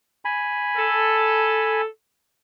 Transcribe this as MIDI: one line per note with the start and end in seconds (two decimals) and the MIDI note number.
0.25 1.81 80
0.25 1.81 83
0.77 1.86 69